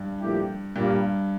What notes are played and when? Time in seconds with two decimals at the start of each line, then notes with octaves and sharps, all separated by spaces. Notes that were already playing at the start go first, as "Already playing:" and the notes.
Already playing: G2
0.20 A#2 F3 A3 E4 G4
0.76 G2 A#2 G3 A#3